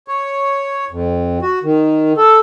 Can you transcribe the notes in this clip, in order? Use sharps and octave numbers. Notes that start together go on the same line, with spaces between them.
C#5
F2
F#4
D#3
A4